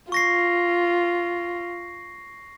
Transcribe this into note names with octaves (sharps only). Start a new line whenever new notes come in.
F4 C#6 A#6 C7